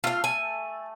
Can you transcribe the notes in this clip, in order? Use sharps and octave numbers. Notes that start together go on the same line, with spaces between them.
A3 F4 G4 A4 F5
G#5